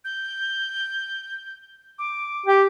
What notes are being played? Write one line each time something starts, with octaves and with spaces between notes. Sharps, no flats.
G6
D6
G4